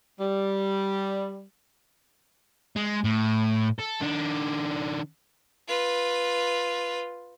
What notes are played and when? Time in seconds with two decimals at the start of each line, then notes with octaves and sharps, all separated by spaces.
0.20 G3
2.76 G#3
3.05 A2
3.79 A4
4.01 D#3 D4
5.68 F4 B4